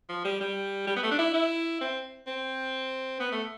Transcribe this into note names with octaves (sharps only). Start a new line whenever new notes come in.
F3
G3
G3
G3
B3
A3
D4
E4
E4
C4
C4
B3
A3